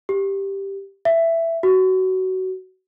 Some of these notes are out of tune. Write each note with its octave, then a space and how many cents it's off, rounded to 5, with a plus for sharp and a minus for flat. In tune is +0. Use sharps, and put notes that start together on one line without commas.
G4 +0
E5 +10
F#4 +20